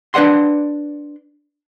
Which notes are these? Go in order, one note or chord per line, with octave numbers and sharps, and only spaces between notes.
D4 B4 D5 F#5 C6